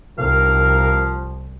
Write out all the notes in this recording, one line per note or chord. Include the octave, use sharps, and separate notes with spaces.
C2 D#3 F3 D#4 A#4 F5